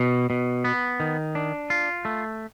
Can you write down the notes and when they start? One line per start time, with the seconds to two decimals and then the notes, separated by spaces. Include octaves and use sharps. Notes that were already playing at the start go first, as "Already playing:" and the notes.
Already playing: B2
0.30 B2
0.64 B3
1.00 D#3
1.35 D4
1.70 F4
2.05 A3